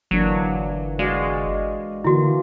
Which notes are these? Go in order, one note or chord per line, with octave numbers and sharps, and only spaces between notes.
G1 E3 F#3 A#3 D4
G#3 F#4 D5 F5
D3 E3 A#3 E4 F#4